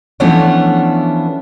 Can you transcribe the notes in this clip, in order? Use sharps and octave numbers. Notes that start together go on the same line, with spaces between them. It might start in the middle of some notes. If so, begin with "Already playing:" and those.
E3 F3 A3 B3 C#4 D4